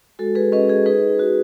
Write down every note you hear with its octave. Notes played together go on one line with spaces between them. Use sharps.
G#3 F#4 A4
G#4 B4
C#4 B4 D#5
G#4
D#4 G#4 B4
F#4